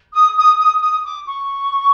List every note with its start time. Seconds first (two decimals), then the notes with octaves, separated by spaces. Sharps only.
0.13 D#6
0.36 D#6
0.58 D#6
0.81 D#6
1.04 D6
1.27 C#6